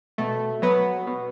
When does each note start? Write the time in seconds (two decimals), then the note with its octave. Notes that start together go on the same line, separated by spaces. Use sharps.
0.18 B2 A3
0.62 F#3 B3
1.07 B2